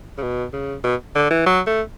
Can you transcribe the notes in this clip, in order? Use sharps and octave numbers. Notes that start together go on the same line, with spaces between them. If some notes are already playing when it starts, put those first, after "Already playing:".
C#3
B2
C#3
B2
D3
E3
F#3
A3